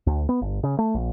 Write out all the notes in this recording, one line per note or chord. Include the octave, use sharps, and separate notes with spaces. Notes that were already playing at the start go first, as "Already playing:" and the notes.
D2
B3
G1
C#3
A3
A#1